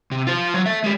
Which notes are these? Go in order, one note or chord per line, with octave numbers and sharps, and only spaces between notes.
C3
F4 C5
F#3
A4 E5
G#3 G4